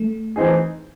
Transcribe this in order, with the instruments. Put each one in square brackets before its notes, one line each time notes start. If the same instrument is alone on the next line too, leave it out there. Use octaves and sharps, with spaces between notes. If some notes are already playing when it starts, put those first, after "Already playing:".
Already playing: [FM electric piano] A3
[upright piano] E3 C4 D#4 G#4